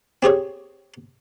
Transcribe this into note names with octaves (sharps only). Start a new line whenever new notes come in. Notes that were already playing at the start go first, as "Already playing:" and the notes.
C4 G4 G#4 C#5